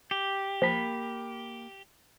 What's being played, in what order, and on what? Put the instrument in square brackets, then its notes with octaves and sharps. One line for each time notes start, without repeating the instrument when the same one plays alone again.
[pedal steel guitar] G4
[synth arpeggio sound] F3 [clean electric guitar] A#3 B5